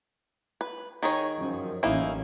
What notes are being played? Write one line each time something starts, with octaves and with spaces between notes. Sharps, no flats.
B4
D#3 G#4 C#5
F#2 F3
A1 A#3 C#4 D#4 E4